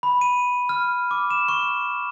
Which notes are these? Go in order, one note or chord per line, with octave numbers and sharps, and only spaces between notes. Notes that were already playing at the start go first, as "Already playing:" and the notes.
B5
D#7
F6
D6
E7
C#6